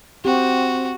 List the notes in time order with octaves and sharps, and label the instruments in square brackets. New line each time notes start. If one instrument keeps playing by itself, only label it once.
[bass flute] C4 [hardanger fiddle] F#4 [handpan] G4